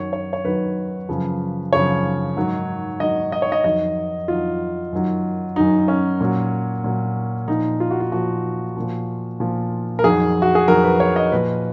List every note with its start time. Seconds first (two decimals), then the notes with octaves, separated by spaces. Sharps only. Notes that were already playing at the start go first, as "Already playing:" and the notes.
Already playing: F#2 D#3 F#3 C#5
0.13 C#5
0.33 C#5
0.44 F#2 D#3 F#3 B4
1.09 F#2 C#3 F3
1.72 F#2 C#3 F3 C#5
2.37 G#2 D#3 F#3
3.00 G#2 D#3 F#3 D#5
3.32 D#5
3.42 C#5
3.52 D#5
3.64 F2 D#3 F#3 D#5
4.28 F2 D#3 F#3 F4
4.92 F#2 D#3 F#3
5.56 F#2 D#3 F#3 D#4
5.88 C#4
6.21 A#2 F#3
6.84 A#2 F#3
7.48 A#2 F3 D#4
7.80 F4
7.91 F#4
8.00 F4
8.12 A#2 F3 F#4
8.76 A#2 F3
9.40 A#2 F3
9.99 A#4
10.04 F2 D#3 F#3 G#4
10.42 F#4
10.55 G#4
10.68 F2 D#3 F#3 A#4
10.84 B4
11.00 C#5
11.16 D#5
11.32 A#2 F3 B4